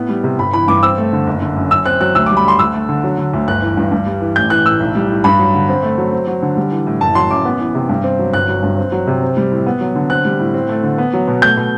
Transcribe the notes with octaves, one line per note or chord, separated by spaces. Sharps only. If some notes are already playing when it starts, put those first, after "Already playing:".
Already playing: A2 B3
G3
C3
G1 B5
E3 B5
G2 D6
C4 E6
A3
D3
F#1
D3
F#2
F#2 E6
C4 F#6
F#3 F#6
D2 E6
G3 D6
B5
D3 C6
D2 E6
A3
D3
F#3
D3
D2
G1 F#6
E3
G2
G2
G3
E3
A1 G6
E3 F#6
A2 E6
B1
G3
A2
G2 B5
F#3
D3
C4
A3
F#3
C4
F#3
D3
G3
E3
A2
F#1 A5
F#3 C6
F#2 D6
B3
E3
C3
G2
C4
F#3
G1 F#6
F#3
G2
C4
F#3
C3
C4
G3
A2
B3
F#3
D3
C4 F#6
G3
A2
C4
A3
D3
B3
F#3
B2
A3 G6
B2